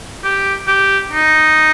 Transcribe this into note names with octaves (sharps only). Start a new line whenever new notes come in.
G4
G4
D#4